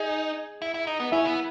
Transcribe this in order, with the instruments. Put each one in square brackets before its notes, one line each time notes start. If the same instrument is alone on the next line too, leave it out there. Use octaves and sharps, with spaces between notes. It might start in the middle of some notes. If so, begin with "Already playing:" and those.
Already playing: [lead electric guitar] D#4 [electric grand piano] G#4 G#5
[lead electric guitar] E4
E4
D#4
B3
[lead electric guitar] C#4 [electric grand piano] E4 E5
[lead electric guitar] B3